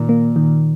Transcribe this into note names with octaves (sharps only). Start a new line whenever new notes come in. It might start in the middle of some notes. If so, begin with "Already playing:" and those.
Already playing: A#2 D#3
A#3
D#3